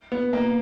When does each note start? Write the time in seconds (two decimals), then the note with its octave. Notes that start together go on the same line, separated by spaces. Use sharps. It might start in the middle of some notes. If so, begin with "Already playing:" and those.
0.12 B3
0.33 A#3